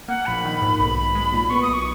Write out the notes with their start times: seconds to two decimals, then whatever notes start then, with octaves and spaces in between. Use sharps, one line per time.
0.08 A#3 F#5
0.26 A#1 B5
0.45 D#3
0.62 G#2
0.79 B1 B5
0.97 B1
1.15 G#3
1.33 A#2
1.50 B3 C#6
1.63 D#6
1.69 B1
1.74 C#6